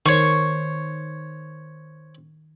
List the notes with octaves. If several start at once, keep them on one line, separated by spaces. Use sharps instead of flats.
D#3 C5 C#5 C#6